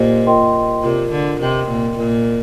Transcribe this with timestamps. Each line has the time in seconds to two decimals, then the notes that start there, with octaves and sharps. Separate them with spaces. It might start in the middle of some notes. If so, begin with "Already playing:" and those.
Already playing: A#2 G4 C5 D#5
0.26 F4 A#4 D#5 G5 C6
0.83 C3 F4 A#4 D5
1.11 D3
1.40 C3 A#4 D#5 G5 C6
1.68 A#2
1.97 A#2 F4 A#4 D#5